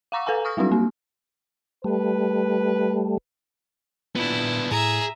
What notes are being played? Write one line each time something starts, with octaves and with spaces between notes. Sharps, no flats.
F5 F#5 A#5 C#6 D6 E6
A4 B4 F5 G#5 A#5
C#6 D#6 F6 A#6
F#3 G3 C4 D4 F#4
A#3
G3 A3 B4
A#2 B3 D4 E4
A2 G#4 E5 A#5